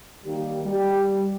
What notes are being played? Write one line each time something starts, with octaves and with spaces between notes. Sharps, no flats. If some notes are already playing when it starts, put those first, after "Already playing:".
D#3 G3 A#3 D#4 G4
G3 G4